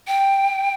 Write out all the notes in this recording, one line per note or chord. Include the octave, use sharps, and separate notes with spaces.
G5